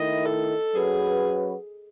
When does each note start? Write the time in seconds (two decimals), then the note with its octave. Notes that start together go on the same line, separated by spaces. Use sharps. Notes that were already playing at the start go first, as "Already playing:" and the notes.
Already playing: D#3 A3 E4 D#5
0.25 A4
0.75 F#3 C#4 F#4 G#4 B4